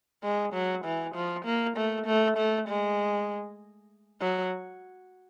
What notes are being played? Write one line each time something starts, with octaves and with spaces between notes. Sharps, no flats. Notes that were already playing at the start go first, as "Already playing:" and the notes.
G#3
F#3
E3
F3
A#3
A3
A3
A3
G#3
F#3